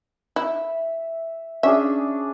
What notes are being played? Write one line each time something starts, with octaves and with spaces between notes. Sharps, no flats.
E4 E5
C#4 D4 G#4 E5